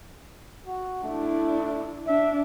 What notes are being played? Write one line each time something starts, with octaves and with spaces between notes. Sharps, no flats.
F#4
A3 D4 E4
D4 E5